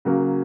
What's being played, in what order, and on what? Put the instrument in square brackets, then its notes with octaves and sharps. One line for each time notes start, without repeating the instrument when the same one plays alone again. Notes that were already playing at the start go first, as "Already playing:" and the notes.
[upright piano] C#3 F#3 A#3